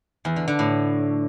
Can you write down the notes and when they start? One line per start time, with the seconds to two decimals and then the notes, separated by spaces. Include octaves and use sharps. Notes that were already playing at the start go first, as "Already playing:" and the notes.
0.25 E2
0.36 D3
0.48 D3
0.59 A2